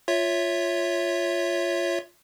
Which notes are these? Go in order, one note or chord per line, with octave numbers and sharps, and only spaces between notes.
F4 C#5 E5